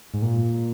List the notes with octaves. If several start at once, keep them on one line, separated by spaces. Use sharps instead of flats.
G#2
A#2